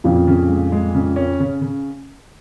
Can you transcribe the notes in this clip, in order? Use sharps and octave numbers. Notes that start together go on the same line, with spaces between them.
F2 A#2 C#3
C#3
G#3
G#3
C#3
C#4
C#3
C#3